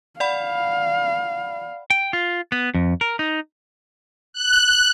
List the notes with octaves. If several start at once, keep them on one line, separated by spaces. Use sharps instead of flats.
D5 F5 F#5 B5
G5
F4
B3
F2
A#4
D#4
F#6